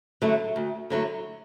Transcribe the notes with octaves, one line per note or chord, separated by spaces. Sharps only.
D3 F#3 A3 E4
D2
D3 F#3 A3 E4